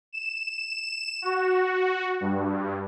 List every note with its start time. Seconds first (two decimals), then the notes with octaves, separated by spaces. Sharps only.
0.13 E7
1.22 F#4
2.21 G2